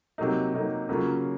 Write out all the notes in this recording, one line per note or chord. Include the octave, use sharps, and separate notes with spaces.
C3 F#3 A#3 D#4
C3 F#3 A#3 D#4
C#3 F#3 A#3 C#4 F4